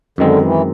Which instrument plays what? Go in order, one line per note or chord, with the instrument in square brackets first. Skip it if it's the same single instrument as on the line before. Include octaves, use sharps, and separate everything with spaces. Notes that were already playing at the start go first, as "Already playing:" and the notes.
[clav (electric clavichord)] F#2 D#3 G#3 C4 [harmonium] D3
[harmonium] E3